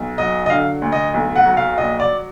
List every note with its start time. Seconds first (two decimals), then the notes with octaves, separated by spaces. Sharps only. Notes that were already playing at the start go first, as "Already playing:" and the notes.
Already playing: B1
0.18 F#3 D#5
0.46 D#5
0.50 D3 F5
0.82 D2
0.92 D#5
1.14 B1
1.36 F#5
1.46 F#3
1.57 F5
1.78 A#1 D#5
2.00 D5